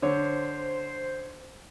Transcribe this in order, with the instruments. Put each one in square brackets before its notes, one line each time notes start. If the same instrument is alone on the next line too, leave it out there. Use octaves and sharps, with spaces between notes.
[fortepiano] D3 C#5 [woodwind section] C5